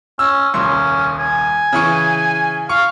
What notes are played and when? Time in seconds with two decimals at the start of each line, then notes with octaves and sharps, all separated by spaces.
0.19 C#4 E6
0.54 D#1 C2 C#4 C6
1.19 G#5
1.73 C#3 E3 C#6
2.69 F5 C#6